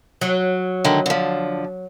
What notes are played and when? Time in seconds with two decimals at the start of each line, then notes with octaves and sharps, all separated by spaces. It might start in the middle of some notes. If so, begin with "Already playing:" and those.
0.21 F#3
0.84 D3 D#3 A3
1.06 D3 F3